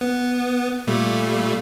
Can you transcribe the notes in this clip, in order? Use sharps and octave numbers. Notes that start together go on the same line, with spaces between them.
B3
A#2 G3 A3